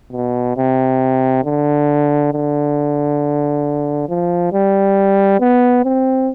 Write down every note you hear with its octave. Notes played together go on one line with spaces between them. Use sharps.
B2
C3
D3
D3
F3
G3
B3
C4